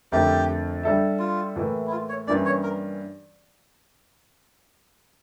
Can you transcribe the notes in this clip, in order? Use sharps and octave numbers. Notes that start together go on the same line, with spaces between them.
F2 D3 A3 E4 G4 A#4
G3 D4 A4 E5
F4
A2 E3 A#3
E4
F4
C#5
G2 E3 A#3 C#4 D5
C#5
A#4